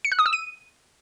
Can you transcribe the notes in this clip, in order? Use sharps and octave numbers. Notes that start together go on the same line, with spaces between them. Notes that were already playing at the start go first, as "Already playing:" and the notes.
C#7
F#6
D#6
E6
D#7